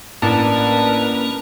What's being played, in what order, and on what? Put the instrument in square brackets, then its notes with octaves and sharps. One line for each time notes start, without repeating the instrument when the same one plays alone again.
[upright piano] A1 [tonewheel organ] A#3 C#4 [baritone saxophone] D4 [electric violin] A#4 B4